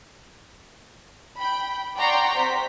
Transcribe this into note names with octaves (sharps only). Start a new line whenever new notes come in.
G5 B5
D5 F#5 G5 A#5 C6 C#6
C3 C5 B6